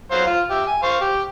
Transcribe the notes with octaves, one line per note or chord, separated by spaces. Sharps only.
F#3 C5 F5
F4
G4 E5
G#5
C5 F5 C#6
G4